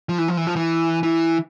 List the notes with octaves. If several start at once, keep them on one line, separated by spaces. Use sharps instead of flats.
F3
E3
F3
E3
F3
E3
E3